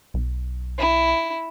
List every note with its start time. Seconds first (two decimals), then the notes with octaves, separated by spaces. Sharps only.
0.14 B1
0.79 E4